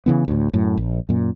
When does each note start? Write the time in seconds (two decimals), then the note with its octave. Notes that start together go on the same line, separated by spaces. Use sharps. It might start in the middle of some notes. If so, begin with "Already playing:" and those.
0.06 C#3 E3 B3
0.28 D2 A2
0.53 F#2 A2
0.77 A#1
1.09 F#2 A#2